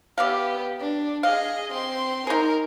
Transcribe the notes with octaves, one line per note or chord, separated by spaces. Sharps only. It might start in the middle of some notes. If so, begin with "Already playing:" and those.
B3 G4 D5 E5 F5
D4
G#4 D#5 F5
C4 C6
D#4 G#4 A#4